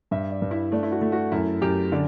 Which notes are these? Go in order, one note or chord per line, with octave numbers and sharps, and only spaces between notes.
G2 E5
D5
G2
E4
A3 D4
E4
F#4
A3
F#4
F#2 E4
F#2 G4
D3 D5